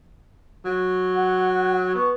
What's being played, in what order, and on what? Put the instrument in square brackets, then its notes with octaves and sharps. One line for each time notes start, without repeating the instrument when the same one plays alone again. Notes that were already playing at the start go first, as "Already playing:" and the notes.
[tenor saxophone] F#3
[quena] F#5
[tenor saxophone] B3 [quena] C#6